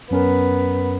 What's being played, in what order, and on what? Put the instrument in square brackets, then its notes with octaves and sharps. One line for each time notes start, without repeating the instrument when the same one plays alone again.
[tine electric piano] F#2 C#4 A#4 [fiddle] B3